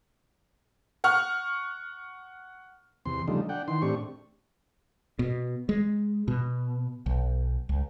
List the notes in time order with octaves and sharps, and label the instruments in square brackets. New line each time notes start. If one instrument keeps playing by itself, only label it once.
[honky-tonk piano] F#5 C#6 F6
[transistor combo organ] E2 C3 C6
C#3 F3 G3 A3 D4 D#4
D4 F#5 G5
D#3 E3 C6
A2 C4 D4 G4 C#6
[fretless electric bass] B2
G#3
B2
B1
C#2